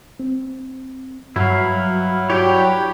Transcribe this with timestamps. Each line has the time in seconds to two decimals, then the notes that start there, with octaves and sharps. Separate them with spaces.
0.20 C4
1.36 G2 F#3 E4 B4 F5
2.30 F#3 D4 E4 G4 B4 C#5